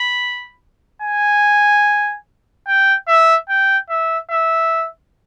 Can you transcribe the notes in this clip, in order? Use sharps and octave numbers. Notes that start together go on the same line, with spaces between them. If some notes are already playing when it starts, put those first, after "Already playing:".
Already playing: B5
G#5
G5
E5
G5
E5
E5